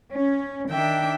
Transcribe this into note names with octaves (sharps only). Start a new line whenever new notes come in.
C#4
D#3 D4 E5 G5